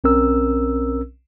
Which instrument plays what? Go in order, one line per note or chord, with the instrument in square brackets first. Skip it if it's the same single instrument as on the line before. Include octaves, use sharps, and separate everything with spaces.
[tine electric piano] B1 C4 C#4 A#4 E6